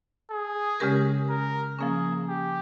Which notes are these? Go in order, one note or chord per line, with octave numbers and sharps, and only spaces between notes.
G#4
C#3 G#3 C#4 G4 A#4
A#4
F3 A#3 C#4 G#4
G4